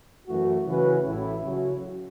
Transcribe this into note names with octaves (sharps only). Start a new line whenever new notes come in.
F#2 E3 A3 F#4
C#3 E3 C#4 F#4 B4
A1 A2 A3 E4
C#3 F#3 C#4 F#4